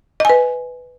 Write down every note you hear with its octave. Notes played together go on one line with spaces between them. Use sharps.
B4 D#5 G#5